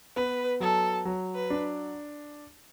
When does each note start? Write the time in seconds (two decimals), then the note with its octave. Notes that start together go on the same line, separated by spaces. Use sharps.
0.16 B3 B4
0.60 F#3 A4
1.05 F#3
1.35 B4
1.50 D4